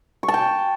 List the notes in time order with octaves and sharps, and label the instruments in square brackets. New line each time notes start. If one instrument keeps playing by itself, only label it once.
[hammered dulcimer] C#6
A5
G5